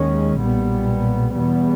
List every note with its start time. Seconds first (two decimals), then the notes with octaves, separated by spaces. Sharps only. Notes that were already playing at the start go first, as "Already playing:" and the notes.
Already playing: D#2 D#3 G#3 C#4
0.40 B1 A#2 G3 B3
1.35 E2 B2 G3 B3